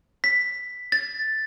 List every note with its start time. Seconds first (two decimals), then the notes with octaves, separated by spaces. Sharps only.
0.24 B6
0.92 A6